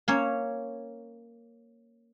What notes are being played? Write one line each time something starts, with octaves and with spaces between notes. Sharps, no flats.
A#3 C#4 C#5